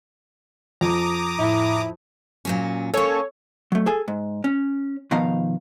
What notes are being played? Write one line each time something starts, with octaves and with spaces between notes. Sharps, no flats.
F2 A#5 D6 D#6
A2 E4
A#2 F#3 C#4
A#3 C#4 A4 C#5
F#3 A3
G#4 A4 G#5
G#2
C#4
B2 D#3 F3 B3 F5 A#5